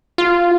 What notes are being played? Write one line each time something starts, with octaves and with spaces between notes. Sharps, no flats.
F4